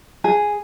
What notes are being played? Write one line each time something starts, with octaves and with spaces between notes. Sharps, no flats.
G#4